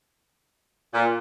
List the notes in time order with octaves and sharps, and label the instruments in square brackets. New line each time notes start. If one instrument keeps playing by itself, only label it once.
[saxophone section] A#2